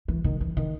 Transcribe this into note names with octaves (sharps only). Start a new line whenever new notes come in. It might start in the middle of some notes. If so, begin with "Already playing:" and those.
E3
D#3
E3
D#3